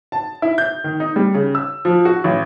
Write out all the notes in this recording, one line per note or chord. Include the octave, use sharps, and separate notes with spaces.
A5
E4
G6
D#3
D#4
G3
C#3
E6
F3
F#4
A1